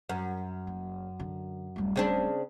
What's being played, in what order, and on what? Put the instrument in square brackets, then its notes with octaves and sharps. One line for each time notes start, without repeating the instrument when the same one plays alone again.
[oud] F#2
[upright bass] F#1
D3 D4
D1 G3
[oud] C#3 C4 D4